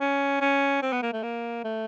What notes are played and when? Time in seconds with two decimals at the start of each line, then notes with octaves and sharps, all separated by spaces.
0.01 C#4
0.41 C#4
0.82 C4
0.93 B3
1.02 A#3
1.13 A3
1.23 A#3
1.64 A3